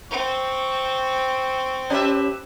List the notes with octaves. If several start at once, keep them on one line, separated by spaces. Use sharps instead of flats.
C4 C#6
C#4 G4 B4 E5